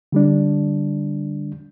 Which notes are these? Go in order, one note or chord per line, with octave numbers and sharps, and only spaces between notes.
D3 G3 D4